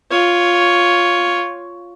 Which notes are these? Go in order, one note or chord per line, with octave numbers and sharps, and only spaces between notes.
F4 C#5